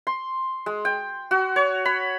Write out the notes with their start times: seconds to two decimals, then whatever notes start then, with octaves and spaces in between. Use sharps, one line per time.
0.07 C6
0.66 G#3
0.85 G5
1.31 F#4
1.56 C#5
1.85 B5